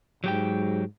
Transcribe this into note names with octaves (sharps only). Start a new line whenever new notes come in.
G#2 F#3 G4 G5